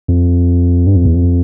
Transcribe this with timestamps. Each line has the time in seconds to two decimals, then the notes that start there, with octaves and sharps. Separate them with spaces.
0.08 F2
0.87 G2
0.96 F2
1.05 E2
1.15 F2